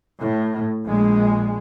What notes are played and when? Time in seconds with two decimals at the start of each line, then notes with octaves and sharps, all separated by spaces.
0.19 A2
0.86 A#1 G#3